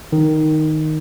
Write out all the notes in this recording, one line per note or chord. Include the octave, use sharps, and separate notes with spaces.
D#3